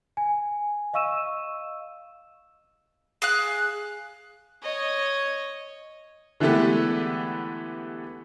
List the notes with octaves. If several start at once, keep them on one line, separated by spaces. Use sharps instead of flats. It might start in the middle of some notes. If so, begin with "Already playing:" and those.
G#5
D#5 F5 C#6 E6 D#7 E7
G#4 F5 F#6
C#5 D#5
D3 E3 G#3 A3 B3 G4